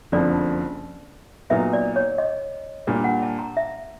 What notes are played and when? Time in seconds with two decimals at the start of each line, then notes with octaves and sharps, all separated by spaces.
0.12 F#1 F2 D3 F3 D5
1.50 A#2 F#3 B3 D#4 E5
1.73 D5
1.96 C#5
2.18 D#5
2.87 A#2 G3 A#3 D4
3.04 F#5
3.23 A5
3.39 A#5
3.57 E5